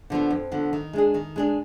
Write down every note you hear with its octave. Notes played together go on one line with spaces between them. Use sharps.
D3 F3 B3
F2
D3 F3 B3
D#3
G#3 D4 G#4
D#3
G#3 D4 G#4